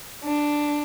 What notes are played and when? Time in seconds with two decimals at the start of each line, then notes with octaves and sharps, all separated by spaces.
0.24 D4